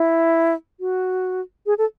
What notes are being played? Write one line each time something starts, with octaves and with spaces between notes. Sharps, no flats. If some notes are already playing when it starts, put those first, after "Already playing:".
Already playing: E4
F#4
G#4
A4